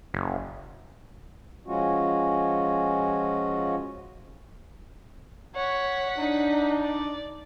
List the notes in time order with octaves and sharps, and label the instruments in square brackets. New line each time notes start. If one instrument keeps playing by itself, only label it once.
[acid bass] F#1
[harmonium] F3 G#3 C#4 F4 F#4
[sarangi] C#5 [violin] F#5 B6
[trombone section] D4 [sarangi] D#4
[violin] D5